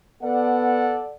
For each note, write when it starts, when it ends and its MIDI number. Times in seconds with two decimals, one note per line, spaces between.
0.23 1.02 59
0.23 1.15 69
0.23 1.15 74
0.23 1.15 78